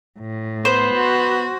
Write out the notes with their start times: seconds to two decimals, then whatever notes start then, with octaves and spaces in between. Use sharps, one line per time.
0.19 A2
0.65 B3 C5
0.94 F#4